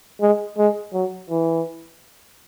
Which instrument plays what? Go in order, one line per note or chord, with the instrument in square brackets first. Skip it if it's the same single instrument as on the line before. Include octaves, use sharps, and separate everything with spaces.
[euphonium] G#3
G#3
F#3
E3